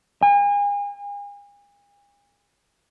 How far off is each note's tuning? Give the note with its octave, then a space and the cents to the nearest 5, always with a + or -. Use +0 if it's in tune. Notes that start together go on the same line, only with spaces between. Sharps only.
G#5 -40